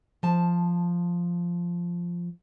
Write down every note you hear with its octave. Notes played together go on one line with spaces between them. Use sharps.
F3 A5